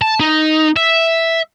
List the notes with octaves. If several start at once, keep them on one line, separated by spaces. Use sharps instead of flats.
A5
D#4
E5